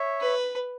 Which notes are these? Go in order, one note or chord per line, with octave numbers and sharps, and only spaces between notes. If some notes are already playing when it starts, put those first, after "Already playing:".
Already playing: C#5 E5
B4